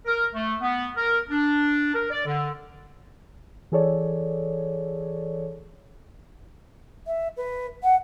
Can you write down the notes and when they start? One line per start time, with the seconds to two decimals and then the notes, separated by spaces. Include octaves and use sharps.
0.06 A#4
0.34 A3
0.62 B3
0.96 A#4
1.30 D4
1.94 A#4
2.11 D5
2.26 D3
3.72 E3 G#4 A4 C#5 D5
7.07 E5
7.37 B4
7.83 F#5